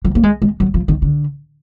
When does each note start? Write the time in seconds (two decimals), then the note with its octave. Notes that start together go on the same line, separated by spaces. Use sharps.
0.05 F3
0.15 A#3
0.23 G#3
0.42 G#3
0.60 F#3
0.74 F3
0.88 D#3
1.02 D3